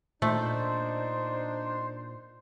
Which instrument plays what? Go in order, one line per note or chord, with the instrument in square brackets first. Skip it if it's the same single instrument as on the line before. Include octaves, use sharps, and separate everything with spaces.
[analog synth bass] A#2 [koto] A3 [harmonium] D4 D#4 [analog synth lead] C5